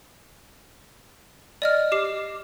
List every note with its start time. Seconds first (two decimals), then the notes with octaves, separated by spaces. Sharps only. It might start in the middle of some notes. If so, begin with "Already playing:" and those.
1.62 D5 D#5 F6
1.92 G4 D6 C7